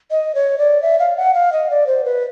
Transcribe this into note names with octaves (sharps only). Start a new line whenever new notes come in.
D#5
C#5
D5
E5
F5
F#5
F5
D#5
D5
C5
B4